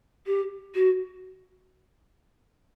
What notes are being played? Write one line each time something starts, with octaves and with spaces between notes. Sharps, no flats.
G4
F#4